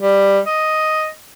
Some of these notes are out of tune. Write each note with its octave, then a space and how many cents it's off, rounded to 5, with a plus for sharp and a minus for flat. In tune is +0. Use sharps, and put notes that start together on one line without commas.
G3 +10
D#5 +5